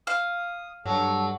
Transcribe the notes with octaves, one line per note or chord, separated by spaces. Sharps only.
F5 D#6
G2 F#3 A4